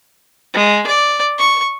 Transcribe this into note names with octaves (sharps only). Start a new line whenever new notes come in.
G#3
D5
C#6